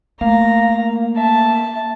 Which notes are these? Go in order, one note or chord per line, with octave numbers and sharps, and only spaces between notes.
A3 A#3 F5 A#5
E5 A5